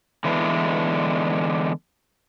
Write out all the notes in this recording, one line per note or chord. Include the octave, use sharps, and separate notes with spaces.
D3 E3 G#3 B3 D4